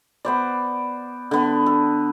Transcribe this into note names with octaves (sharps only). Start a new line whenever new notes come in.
B3 C5 D5
D3 B3
A4